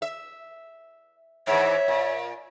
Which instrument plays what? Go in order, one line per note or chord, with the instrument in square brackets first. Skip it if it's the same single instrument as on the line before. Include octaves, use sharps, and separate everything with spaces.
[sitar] E5
[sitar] G#2 E3 [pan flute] C#5 [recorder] E5
[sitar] A#2